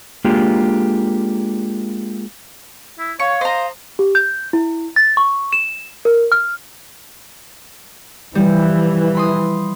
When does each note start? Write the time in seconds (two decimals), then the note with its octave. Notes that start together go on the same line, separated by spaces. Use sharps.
0.25 G#3 A#3 D4 F4 G4
2.98 E4
3.20 C#5 F5 C#6
3.41 C5 D#5 A#5
3.99 G4
4.15 G6
4.53 E4
4.96 A6
5.17 C#6
5.53 E7
6.05 A#4
6.32 F6
8.35 E3 F3 G3
9.15 B5 C6 D#6